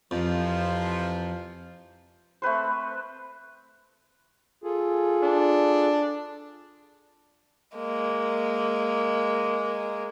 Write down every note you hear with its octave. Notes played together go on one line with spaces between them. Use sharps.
F2 C3 E3 F3
A3 C4 B4 C5
F4 G#4 A4
D4
G#3 A#3